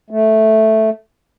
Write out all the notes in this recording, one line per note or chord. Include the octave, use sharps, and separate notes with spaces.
A3